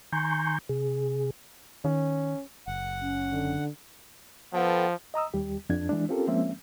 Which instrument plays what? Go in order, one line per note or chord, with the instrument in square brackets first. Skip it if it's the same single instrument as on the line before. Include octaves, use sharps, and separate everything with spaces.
[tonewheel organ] D#3 G#5 A#5 C6 C#6 G6
C3 G#4
[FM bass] D#3 [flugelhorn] C#4
[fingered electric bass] F#1 [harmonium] F#5
[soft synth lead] C#4
[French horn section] D3
[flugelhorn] F3 [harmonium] B3 A4 G5
[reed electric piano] D#5 A#5 D#6 E6
D#2 G3 G4
F2 D4 G#6
E3 G#3 D4
C4 C#4 F4 G4 A4 A#4
F3 G#3 A#3 C4 C#4 E5